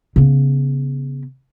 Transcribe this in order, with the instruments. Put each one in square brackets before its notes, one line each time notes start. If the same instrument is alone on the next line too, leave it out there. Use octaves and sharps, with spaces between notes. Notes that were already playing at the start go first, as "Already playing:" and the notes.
[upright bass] C#3 B3